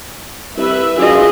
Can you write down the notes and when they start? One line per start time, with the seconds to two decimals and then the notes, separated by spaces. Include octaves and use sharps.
0.57 C2 B4 E5
0.97 F#2 D4 F4 G#4 D#5